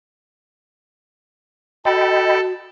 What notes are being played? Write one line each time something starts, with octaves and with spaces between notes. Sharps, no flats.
F#4 A4 D#5 G5 B5